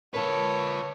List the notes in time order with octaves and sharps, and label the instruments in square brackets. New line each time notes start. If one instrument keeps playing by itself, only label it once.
[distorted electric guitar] F4 B4 [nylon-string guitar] A#4 A5 [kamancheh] C#5